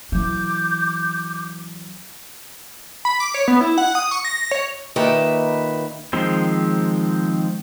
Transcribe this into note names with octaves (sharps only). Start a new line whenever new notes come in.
E3 F#3 D6 G6
B5
D6
C#5
B3
E4
F#5
D#6
C#6
A#6
A#6
C#5
A#2 D#3 A#3 D#4 B4 E5
D#3 F3 G#3 C4